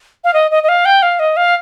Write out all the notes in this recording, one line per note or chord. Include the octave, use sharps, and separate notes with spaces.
F5
D#5
D#5
D#5
F5
G5
F5
D#5
F5